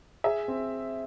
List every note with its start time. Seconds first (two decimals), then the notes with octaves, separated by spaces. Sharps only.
0.24 G#4 E5
0.48 C4